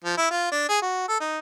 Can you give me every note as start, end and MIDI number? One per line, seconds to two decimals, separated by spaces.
0.04 0.17 53
0.17 0.28 64
0.31 0.49 65
0.52 0.68 62
0.69 0.82 68
0.82 1.03 66
1.08 1.18 69
1.20 1.39 63